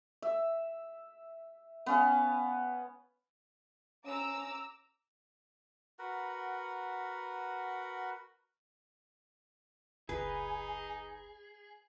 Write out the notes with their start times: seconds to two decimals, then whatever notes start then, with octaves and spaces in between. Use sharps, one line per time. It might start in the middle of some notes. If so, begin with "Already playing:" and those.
0.22 E5
1.86 B3 C#4 F5
4.06 C#4 A#5 D6 E6
5.99 F#4 A#4 B4 F#5
10.09 F#1 C#2 D#4 G#4 B4